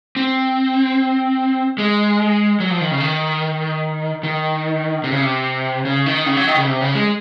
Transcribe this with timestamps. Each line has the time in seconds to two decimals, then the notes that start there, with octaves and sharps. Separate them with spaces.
0.17 C4
1.78 G#3
2.60 F#3
2.70 F3
2.81 D#3
2.91 C#3
3.00 D#3
4.23 D#3
5.04 C3
5.12 C#3
5.21 C3
5.85 C#3
6.06 D#3
6.26 C#3
6.37 F#3
6.47 D#3
6.57 C#3
6.67 C3
6.81 C#3
6.95 G#3